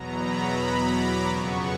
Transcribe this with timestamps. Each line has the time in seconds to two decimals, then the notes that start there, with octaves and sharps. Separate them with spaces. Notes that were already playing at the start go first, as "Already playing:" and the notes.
Already playing: E2 B2 F#3 B3 A#5
0.20 B5
0.91 D6
1.26 F2 C#3 F#3 B3 C#6